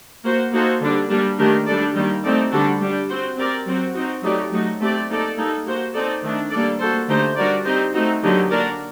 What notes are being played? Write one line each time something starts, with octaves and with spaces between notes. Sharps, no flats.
A#3 F#4 C5
A#3 D#4 F#4 A4 C5
D3 G3 D4
G3 A#3 D4
D#3 A3 D4 G4 A#4
G3 D4 A4 D5
D#3 G3 A#3
A3 C4 D#4 A4 D5
D3 G3 D4 F#4 A4
G3 D4 G4
C4 F#4 C5
C4 G4 A#4 D5
F#3 C4 F#4
C4 D#4 F#4
F#3 A3 D#4 G4 D5
F#3 A3 D#4 F#4
A3 C4 G4 D5
A#3 D#4 A4 D5
G3 A#3 D#4 A4
A#3 F#4 C5
C4 D#4 A4 D5
D#3 A3 D4
G3 A#3 D4 A4 D5
A#3 F#4 A4 C5
D3 A3 D#4 G4 C5
G3 D4 F#4 A#4 D5
C4 D#4 G4 C5
A3 C4 D#4 F#4
D3 F#3 A#3 D#4 G4
A#3 D4 F#4 A#4 D5